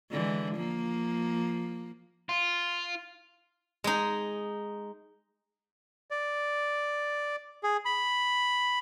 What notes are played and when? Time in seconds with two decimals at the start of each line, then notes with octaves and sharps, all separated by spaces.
0.11 D3 E3 G#3
0.55 F3 A#3
2.29 F4
3.84 G#3 D#4
6.11 D5
7.63 G#4
7.85 B5